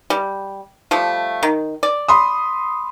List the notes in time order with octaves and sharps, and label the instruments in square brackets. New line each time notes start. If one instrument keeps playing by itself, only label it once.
[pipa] G3
F3 G3 A3
D#3
D5
[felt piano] B5 C6 D#6